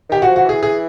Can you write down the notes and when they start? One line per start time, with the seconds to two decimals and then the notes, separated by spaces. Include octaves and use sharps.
0.09 D#3 G4
0.22 F#4
0.27 F3
0.36 F#4
0.45 E3 G#4
0.63 G#4